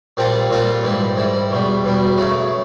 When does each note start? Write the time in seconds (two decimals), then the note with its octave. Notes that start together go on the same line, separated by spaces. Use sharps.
0.17 A#2 G3 C4 F4 A4
0.50 A#2 G3 C4 F4 A4
0.83 G#2 E3 G3
1.16 G#2 E3 G3
1.51 E2 B2 G3
1.84 E2 B2 G3
2.18 F#2 C#3 F#3 A3